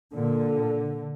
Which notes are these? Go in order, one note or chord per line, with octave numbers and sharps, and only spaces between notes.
A#2 D3